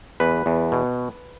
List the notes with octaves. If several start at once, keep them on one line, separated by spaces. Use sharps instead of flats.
E2 B4
E2
B2